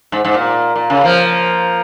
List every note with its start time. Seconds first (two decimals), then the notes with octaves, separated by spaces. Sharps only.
0.12 G#2
0.25 G#2
0.34 A#2
0.76 A#2
0.90 C#3
1.04 F3 A#3